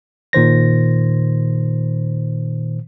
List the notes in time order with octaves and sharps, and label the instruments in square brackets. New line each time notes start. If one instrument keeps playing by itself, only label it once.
[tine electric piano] A#2 D#3 C5 A#6